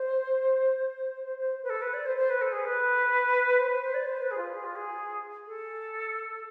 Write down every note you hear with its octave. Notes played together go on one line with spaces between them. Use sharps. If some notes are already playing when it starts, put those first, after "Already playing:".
Already playing: C5
C5
C5
B4
A4
B4
D5
C5
C5
B4
A4
G#4
B4
C5
C5
C5
D5
C5
B4
G#4
F4
G#4
F4
G#4
A4